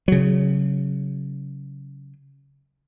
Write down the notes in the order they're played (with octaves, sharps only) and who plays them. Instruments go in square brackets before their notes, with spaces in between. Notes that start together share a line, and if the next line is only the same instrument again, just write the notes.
[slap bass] C#3 F#3